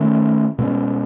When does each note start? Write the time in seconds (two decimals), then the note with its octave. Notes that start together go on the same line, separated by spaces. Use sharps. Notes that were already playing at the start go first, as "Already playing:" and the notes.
Already playing: D#3 A3 C#4
0.58 B2 G#3 C#4